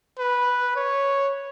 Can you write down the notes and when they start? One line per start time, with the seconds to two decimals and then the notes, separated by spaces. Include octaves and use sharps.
0.19 B4
0.76 C#5